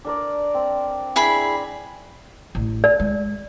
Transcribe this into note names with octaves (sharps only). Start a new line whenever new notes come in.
D4 A#4 D5
C4
D4 E4 G#4 A#5 B5
A1
D5
G#3